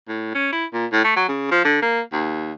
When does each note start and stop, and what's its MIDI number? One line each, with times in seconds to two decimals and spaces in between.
0.09 0.30 45
0.34 0.50 61
0.52 0.65 64
0.73 0.86 46
0.92 1.04 45
1.04 1.15 57
1.16 1.25 54
1.28 1.47 49
1.51 1.60 53
1.65 1.81 50
1.82 2.01 58
2.13 2.53 39